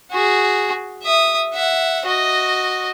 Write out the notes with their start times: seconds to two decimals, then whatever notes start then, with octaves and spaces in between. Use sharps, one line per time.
0.11 F#4 G#4
1.03 E5 D#6
1.54 E5 F#5
2.06 F#4 D#5